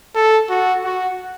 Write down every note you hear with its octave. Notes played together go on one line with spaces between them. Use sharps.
A4
F#4
F#4